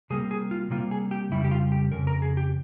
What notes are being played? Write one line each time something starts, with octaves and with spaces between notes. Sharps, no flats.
C3 G3 A#3 G#4
G#4
F4
C3 G3 A#3 F4
G#4
G4
F2 C#3 G3 E4
G4
F4
G4
F2 C#3 A#4
A#4
G#4
G4